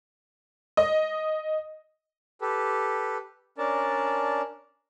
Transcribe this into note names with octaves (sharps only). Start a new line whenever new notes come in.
D#5
G4 A4 B4
C#4 D4 A#4 D5 A5